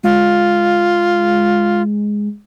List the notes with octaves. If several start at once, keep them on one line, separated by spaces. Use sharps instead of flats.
G#3 F4